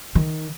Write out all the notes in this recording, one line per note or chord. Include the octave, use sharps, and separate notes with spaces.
D#3